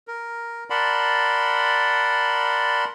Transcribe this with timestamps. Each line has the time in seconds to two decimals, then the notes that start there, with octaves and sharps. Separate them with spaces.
0.08 A#4
0.70 A#4 D5 F#5 A5 B5 C6